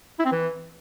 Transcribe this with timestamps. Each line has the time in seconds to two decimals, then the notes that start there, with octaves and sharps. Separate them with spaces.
0.19 E4
0.25 C4
0.32 E3